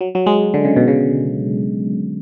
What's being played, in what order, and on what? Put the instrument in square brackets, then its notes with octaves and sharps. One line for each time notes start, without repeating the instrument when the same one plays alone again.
[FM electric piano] F#3
F#3
G#3
D3
C#3
B2
C#3